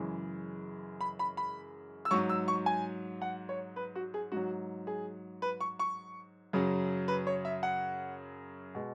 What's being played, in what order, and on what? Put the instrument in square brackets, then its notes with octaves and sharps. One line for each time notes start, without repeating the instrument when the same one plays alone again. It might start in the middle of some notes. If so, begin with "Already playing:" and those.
Already playing: [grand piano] F#2 C#3 E3 G#3
B5
B5
B5
E6
G#2 F#3 C#6
E6
C#6
G#5
F#5
C#5
B4
F#4
G#4
G#2 F#3 F#4
G#4
B4
C#6
C#6
F#2 C#3 F#3
B4
C#5
E5
F#5
B2 G#3